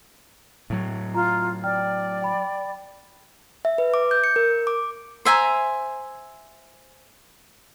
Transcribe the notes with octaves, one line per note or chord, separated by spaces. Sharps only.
A2 F#3
F4 A#5
D5 G5 F6
G5 B5
E5
B4
D6
G6
C#7
A#4
D6
C5 E5 G#5 A#5